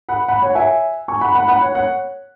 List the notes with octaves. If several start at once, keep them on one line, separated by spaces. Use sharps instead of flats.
F#5 B5
F#5 B5
C#5 F#5
E5 G#5
G#5 C#6
F#5 B5
F#5 B5
F#5 B5
C#5 F#5
C#5 F#5